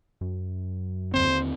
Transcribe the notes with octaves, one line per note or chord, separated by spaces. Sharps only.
F#2
D#2 D3 C4 C5